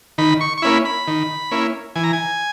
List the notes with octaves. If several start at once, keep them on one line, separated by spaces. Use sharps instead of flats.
D#3 B5
C#6
C#6
A#3 C#4 E4 B5
B5
D#3
A#3 C#4 E4
E3 G#5
A#5
G#5